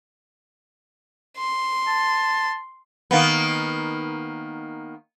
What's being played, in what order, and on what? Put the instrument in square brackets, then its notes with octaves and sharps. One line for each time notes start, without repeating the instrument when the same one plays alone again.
[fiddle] C6
[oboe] A5
[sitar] D#3 A#3 B3